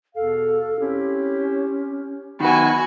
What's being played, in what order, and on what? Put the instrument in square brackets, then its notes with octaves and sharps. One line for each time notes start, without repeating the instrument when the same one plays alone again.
[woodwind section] E2 B2 F5 [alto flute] A4
[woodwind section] C4 E4 G4 [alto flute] C#4
[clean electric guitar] D#3 B4 [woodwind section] B3 [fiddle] F#4 G#5 [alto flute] B5